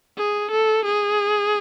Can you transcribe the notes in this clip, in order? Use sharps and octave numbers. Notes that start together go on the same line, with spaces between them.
G#4
A4
G#4